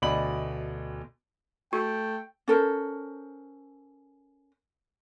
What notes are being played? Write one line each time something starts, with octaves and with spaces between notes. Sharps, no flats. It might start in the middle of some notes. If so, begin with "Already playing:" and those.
D2 B2 D5 D#5 B5 F#7
A3 F#4 G5
C#4 A4 A#4 C5